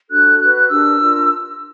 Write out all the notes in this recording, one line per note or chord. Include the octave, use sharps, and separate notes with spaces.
D4 F#4 A4 F#6
F#4 B4 F#6
F#6
D4 G4 A#4 E6
D4 F4 A#4